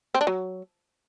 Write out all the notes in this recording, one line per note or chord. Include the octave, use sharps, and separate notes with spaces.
C4
D4
F#3